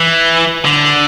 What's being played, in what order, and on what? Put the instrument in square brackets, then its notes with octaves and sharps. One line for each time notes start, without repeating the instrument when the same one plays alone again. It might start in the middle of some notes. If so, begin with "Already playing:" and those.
Already playing: [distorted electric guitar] E3
D3